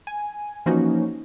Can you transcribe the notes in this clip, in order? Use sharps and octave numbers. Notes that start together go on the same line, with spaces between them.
G#5
E3 F3 A#3 C#4 D#4 F#4